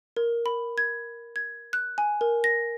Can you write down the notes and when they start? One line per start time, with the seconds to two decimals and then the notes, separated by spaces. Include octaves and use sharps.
0.17 A#4
0.46 B5
0.78 G#6
1.36 G#6
1.73 F#6
1.98 G#5
2.21 A#4
2.44 A#6